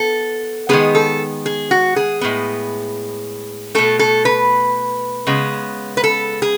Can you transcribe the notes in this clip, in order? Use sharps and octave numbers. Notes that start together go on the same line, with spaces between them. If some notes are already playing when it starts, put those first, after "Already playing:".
Already playing: B3 A4
D#3 G#3 B3 G#4
A4
G#4
F#4
G#4
A2 G#3 B3
B2 A3 A4
A4
B4
C#3 G#3 B3
B4
A4
G#4